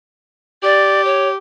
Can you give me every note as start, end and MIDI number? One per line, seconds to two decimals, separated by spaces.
0.63 1.36 67
0.63 1.04 74
1.05 1.28 73